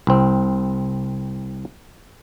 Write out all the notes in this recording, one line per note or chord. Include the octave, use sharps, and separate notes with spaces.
C2 C4